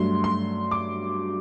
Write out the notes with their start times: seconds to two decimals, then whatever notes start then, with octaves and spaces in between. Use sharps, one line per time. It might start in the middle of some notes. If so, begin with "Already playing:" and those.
Already playing: G2 F#3 A3 C6
0.24 C6
0.71 D6